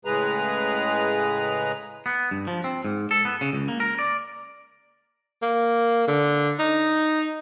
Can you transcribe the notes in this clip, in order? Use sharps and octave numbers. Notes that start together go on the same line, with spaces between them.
A2 C#3 G#3 G#4 B4 A#5
B3
G2
F3
C4
G#2
A4
B3
C#3
C#2
A#3
A#4
D5
A#3
D3
D#4